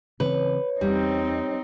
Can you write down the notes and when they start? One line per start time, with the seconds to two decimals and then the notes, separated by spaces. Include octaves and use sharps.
0.20 C#3 E3 C4 B4 C#5
0.81 E2 G3 C4 D#4